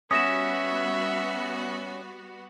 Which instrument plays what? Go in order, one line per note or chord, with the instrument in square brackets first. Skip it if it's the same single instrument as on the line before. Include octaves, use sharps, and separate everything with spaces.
[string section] G3 B3 F#4 [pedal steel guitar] C#4 [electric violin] E5 [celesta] D#6 A#6 E7